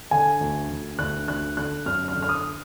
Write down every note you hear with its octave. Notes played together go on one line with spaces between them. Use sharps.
D3 G#5
D2
D2
D2 F#6
D2 F#6
D3 F#6
F#2 F6
F6
D3
F6
D#6